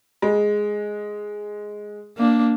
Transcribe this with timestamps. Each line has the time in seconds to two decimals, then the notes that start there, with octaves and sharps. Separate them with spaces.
0.22 G#3
2.17 A#3 D4